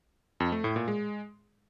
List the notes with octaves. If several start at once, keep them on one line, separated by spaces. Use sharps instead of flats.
F2
A3
A2
A#2
G#3